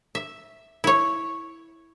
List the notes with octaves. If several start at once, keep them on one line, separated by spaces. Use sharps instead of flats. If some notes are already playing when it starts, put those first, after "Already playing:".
E5
E4 C#5